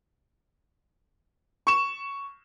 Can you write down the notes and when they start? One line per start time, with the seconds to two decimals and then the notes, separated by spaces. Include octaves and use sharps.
1.67 C#6 E7